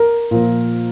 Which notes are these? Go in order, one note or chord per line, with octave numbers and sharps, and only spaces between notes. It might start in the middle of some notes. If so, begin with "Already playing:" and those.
Already playing: A#4
A#2 F3